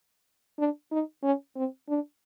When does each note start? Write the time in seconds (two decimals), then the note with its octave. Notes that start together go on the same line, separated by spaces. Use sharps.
0.58 D4
0.91 D#4
1.23 C#4
1.56 C4
1.88 D4